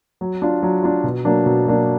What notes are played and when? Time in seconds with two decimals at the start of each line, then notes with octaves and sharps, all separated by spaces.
0.21 F#3
0.42 D4 F4
0.63 F#3
0.83 D4 F4
1.04 B2
1.25 F#3 A#3 D4
1.46 B2
1.66 F#3 A#3 D4